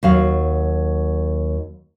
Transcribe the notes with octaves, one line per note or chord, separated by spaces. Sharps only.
D#2 F#3 F5